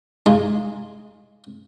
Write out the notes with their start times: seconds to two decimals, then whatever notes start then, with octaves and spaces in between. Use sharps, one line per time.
0.26 G#3 D#4 F4